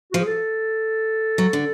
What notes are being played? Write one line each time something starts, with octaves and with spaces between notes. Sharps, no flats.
F3 F#4
G#4
A4
F#3
D3